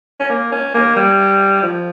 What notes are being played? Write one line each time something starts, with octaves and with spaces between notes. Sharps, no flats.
C#4
A#3
C#4
A#3
G3
F3